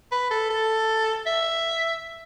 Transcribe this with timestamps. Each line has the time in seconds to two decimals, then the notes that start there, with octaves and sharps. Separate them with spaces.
0.12 B4
0.31 A4
0.50 A4
1.26 E5